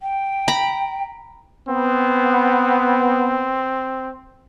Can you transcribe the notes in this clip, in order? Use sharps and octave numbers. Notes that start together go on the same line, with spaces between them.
G5
A#5 B5
B3 C4